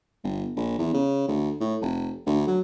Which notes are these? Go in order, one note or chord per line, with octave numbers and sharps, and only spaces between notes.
G1
A#1
E2
C#3
D2
A2
F1
D2
F#3